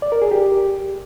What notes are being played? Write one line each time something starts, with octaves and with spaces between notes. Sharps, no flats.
D5
A#4
G#4
G4